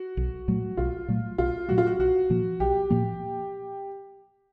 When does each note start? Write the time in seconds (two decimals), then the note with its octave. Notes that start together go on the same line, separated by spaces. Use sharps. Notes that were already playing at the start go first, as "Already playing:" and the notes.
Already playing: F#4
0.17 B1
0.48 A#2 F#3 A3
0.77 B1 F4
1.08 A#2 F#3 A3
1.38 B1 F4
1.68 A#2 F#3 A3 F#4
1.78 F4
1.87 F#4
1.99 B1 F#4
2.30 A#2 F3 A#3
2.60 B1 G4
2.90 A#2 F3 A#3